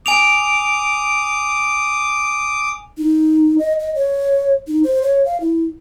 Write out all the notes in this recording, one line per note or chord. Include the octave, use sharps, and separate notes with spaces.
G#5 D6 D#6 D7 F7
D#4
D#5
D#5
C#5
D#4
C5
C#5
F5
E4